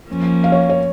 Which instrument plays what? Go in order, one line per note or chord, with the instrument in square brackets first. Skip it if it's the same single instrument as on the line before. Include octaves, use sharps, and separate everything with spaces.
[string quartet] F3 A#3 C#4
[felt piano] F5
C#5
C#5